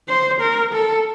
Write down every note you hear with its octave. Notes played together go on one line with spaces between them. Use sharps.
C5
A#4
A4